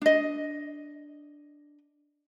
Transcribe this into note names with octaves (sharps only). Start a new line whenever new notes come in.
D4 D#5